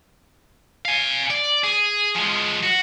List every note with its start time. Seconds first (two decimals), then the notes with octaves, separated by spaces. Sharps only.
0.85 F5 G#5
1.30 D5
1.64 G#4
2.15 F3 G#3
2.63 F#4